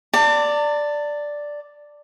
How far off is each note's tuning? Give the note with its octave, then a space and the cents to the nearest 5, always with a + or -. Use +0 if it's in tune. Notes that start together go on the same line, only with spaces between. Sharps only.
D5 +0 A5 +40